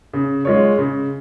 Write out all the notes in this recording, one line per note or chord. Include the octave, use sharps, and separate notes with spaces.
C#3
G#3 F4 C#5
C#3